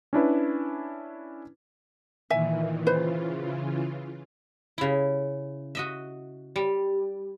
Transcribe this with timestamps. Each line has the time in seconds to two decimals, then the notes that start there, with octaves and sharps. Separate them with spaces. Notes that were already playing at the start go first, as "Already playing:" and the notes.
0.13 C#4 D4 E4 B4
2.30 A#2 D#3 E3 E5 G#5
2.87 C#3 E3 F4 B4 C5
4.78 C#3 E4
5.75 F#4 D#5 E5
6.56 G3